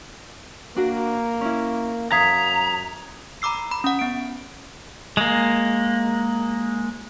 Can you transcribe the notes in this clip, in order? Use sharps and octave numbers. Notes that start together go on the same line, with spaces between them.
A#3 D4 F#4 A#4
C#4 E4
F#2 A4 E5 F5 A#5 D#6 G#6 B6
A#5 B5 D6 E6 C7
B5
C#4 F#5
B3 D7
G#3 A#3